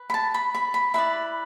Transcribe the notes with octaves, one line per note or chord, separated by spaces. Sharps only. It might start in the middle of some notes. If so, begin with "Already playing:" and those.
Already playing: B4
B5
A5
B5
B5
B5
E4 B4 D5 B5